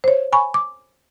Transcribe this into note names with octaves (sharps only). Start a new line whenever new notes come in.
C5 C#5
G#5 B5 C#6
D6